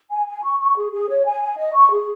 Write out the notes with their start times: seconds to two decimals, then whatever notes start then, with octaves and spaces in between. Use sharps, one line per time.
0.10 G#5
0.26 G#5
0.43 C#6
0.59 C#6
0.75 G#4
0.92 G#4
1.09 C#5
1.25 G#5
1.41 G#5
1.58 D#5
1.74 C#6
1.91 G#4